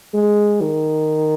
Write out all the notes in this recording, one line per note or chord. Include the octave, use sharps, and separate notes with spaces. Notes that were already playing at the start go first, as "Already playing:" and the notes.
G#3
D#3